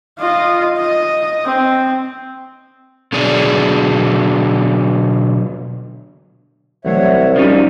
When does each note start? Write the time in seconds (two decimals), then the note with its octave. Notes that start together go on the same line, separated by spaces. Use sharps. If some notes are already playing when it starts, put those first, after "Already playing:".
0.19 F4 D#5
0.77 D#5
1.45 C4
3.13 B2 D3 F#3 G#4 D5
6.85 C2 E3 F#3 A3 C#5 E5 F#5
7.36 A#2 F3 G3 C#4 D#4